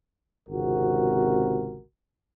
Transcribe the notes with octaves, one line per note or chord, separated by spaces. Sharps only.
G#1 C#2 C3 F#4 A#4